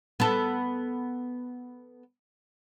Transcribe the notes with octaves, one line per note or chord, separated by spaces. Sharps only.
B3 A4